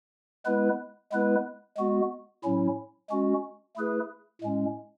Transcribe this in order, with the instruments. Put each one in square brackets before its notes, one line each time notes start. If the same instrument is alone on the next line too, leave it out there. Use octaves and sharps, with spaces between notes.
[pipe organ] G#3 B3 E4 B4
G#3 B3 E4 B4
G#3 B3 F#4
A2 F#3 C#4 E4
G#3 C#4 F#4
A3 E4 G#4 B4
A2 G#3 C#4